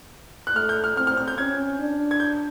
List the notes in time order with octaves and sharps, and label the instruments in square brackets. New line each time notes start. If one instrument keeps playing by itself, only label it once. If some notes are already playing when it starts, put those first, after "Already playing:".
[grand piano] F#6
[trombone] A3 [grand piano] F6
[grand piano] G6
F6
[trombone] C4 [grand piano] F6
[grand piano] F6
F6
G6
[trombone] C#4 [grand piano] G#6
[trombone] D4
[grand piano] G#6
G6